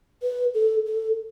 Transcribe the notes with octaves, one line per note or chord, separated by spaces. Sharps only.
B4
A4
A4